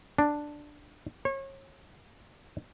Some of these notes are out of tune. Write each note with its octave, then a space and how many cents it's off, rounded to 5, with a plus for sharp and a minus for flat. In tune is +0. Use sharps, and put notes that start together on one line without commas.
D4 +5
C#5 -35